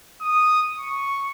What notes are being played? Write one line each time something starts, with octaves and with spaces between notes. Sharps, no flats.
D#6
C#6